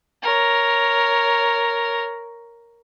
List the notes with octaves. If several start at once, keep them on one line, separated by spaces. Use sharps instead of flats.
A#4 C#5